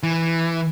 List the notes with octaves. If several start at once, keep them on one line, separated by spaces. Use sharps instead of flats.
E3